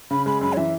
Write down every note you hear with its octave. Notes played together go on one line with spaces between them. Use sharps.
C#3 B5
G#3 B5
F#2 B5
C#5
E3 E5